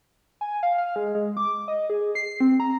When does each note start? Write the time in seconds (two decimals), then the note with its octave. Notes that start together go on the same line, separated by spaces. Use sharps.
0.41 G#5
0.63 F5
0.78 F5
0.96 G#3
1.15 G#3
1.37 D6
1.68 D#5
1.90 G#4
2.15 C7
2.40 C4
2.60 A#5